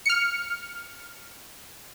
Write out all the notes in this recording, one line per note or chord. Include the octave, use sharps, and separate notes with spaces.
F6 C#7